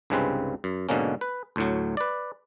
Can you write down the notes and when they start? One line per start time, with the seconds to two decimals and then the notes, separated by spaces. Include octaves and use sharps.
0.10 C2 G2 C#3 G#3 C4 B4
0.64 F#2
0.89 G#2 B2 D3 A#3 C#4
1.21 B4
1.56 D2 A2 F#3
1.97 B4 D5